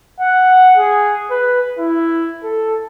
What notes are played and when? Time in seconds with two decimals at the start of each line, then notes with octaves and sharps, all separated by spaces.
0.20 F#5
0.78 G#4
1.30 B4
1.79 E4
2.44 A4